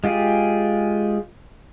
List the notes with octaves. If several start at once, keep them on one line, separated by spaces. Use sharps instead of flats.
G#3 F4 G4 G#4